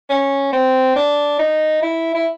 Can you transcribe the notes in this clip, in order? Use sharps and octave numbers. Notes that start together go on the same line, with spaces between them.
C#4
C4
D4
D#4
E4
E4